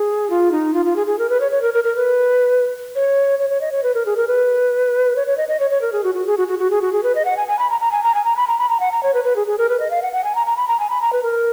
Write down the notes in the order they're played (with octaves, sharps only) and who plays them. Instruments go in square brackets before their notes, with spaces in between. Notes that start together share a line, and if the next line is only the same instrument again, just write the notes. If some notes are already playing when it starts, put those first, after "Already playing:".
Already playing: [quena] G#4
F4
D#4
F4
F4
G#4
G#4
A#4
B4
C#5
C#5
A#4
A#4
A#4
B4
C#5
C#5
C#5
D#5
C#5
B4
A#4
G#4
A#4
B4
C#5
C#5
D#5
D#5
C#5
C#5
A#4
G#4
F#4
F#4
G#4
F#4
F#4
F#4
G#4
F#4
G#4
B4
D#5
F#5
G#5
G#5
B5
A#5
A#5
G#5
A#5
G#5
A#5
B5
A#5
B5
A#5
F#5
A#5
C#5
B4
B4
G#4
G#4
A#4
B4
D#5
F5
F#5
F#5
G#5
A#5
A#5
B5
A#5
G#5
B5
A#5
B4
A#4